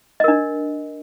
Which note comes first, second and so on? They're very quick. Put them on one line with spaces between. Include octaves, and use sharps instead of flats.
D#5 A#4 D4